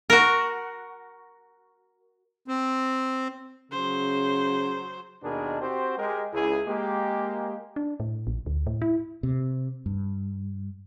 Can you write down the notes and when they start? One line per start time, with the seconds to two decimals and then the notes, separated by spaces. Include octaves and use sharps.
0.10 F#4 A#4
2.48 C4
3.72 C#3 F#3 C5
5.23 D#2 B2 D4 D#4 G#4 A#4
5.61 C4 F#4 G4 C5
5.98 G#3 G4 A#4
6.33 C#2 E4 G#4
6.67 G#3 A#3 G4
7.76 D4
8.00 A2
8.27 A#1
8.46 D2
8.67 A2
8.82 E4
9.23 C3
9.86 G2